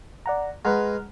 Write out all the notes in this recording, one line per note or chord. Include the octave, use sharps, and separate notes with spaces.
D5 F#5 A#5
G#3 B4 F#5 A#5 F6